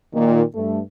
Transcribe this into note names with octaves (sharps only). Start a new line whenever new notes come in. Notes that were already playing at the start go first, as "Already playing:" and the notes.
A#2 D#3
G2 A3